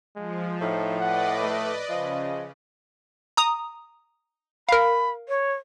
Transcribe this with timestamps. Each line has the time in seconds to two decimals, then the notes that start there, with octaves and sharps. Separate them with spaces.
0.16 F3 G#3
0.61 A2 D#4
1.00 B4 D5 D#5 F#5
1.43 A3
1.90 C#3 F3 D#5
3.37 A#5 D#6
4.69 A#4 F5 B5
5.29 C#5